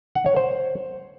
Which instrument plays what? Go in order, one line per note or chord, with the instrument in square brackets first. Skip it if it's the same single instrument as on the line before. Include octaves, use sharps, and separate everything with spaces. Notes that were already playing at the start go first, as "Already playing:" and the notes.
[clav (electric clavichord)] F#5
C#5
C5